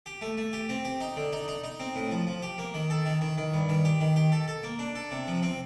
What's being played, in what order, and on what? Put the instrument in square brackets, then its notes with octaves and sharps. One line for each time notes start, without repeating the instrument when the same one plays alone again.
[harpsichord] G4
A3
A3
G4
C4
G4
D#4
D3
D#4
D#4
D#4
C4
A2
F3
F3
G4
A#3
D#3
A4
D#3
D#3
D#3
G2
D#3
G4
D#3
G4
A4
A4
A#3
D4
A4
C3
F3
C4